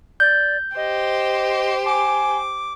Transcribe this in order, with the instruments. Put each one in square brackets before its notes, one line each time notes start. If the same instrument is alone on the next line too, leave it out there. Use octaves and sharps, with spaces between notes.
[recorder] D5 [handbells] G6
[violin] G4 C5 [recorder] D#5
[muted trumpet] G#5 [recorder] D6